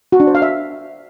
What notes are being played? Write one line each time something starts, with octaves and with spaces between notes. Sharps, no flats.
F#4
D4
C5
F5
E5